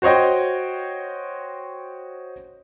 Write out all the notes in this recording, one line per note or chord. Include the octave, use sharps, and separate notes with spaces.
F#4 C5 C#5 D#5 G5